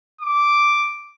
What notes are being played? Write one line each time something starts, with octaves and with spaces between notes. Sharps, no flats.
D6